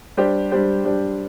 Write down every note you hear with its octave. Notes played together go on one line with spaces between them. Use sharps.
G3 D4 G4 C5
G3 D4 G4 C5
G3 D4 G4 C5